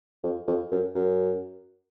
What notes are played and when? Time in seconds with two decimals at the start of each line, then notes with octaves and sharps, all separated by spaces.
0.24 F2
0.47 F2
0.71 F#2
0.95 F#2